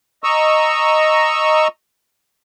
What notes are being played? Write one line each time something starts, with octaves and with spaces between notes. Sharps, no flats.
D#5 A#5 C#6 E6